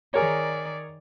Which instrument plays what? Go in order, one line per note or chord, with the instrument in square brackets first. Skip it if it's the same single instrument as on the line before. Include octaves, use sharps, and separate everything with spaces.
[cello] D#3 D5 [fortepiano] G#4 A#4 C#5